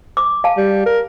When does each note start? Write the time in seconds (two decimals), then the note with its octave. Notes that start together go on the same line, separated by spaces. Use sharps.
0.17 D6
0.44 F5 A5
0.57 G3
0.86 A#4